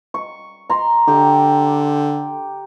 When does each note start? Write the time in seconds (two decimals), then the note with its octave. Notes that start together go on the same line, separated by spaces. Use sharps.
0.14 C#6
0.70 A#5 C6
1.08 D3 G4